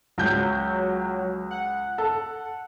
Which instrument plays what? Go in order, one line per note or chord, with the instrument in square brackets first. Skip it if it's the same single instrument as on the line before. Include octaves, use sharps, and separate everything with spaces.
[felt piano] C#2 G6 [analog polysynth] F#3
[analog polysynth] F#5
[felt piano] A4